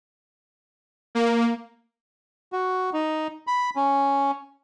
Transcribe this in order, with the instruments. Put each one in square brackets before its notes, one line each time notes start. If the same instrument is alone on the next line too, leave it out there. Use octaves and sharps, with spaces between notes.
[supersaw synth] A#3
[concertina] F#4
D#4
B5
C#4